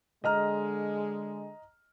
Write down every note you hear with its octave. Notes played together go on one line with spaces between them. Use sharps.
D3 G#3 D#5 A#5 F6